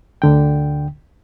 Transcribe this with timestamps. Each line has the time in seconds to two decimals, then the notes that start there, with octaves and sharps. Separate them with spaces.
0.22 D2 D3 G5